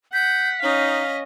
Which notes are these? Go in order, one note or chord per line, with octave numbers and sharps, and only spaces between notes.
F#5 G6 B6
C#4 D#4 D#5 F5